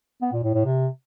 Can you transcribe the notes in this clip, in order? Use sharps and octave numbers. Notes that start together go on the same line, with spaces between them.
B3
A#2
A2
A2
C3